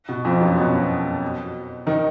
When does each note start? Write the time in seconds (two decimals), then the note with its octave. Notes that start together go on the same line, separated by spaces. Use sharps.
0.09 B2
0.25 F2 F3
0.41 F#2 F#3
0.57 B2 B3
1.87 D#3 D#4